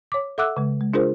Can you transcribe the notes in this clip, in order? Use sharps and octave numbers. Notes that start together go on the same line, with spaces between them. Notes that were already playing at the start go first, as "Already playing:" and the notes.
C#5 D6
A4 E5 F#5 D6 E6 F#6
C#3 G#3
G#3
D4 F4 G#4 A#4 C5